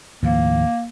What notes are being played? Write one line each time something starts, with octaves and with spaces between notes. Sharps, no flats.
D#2 A2 F3 A#3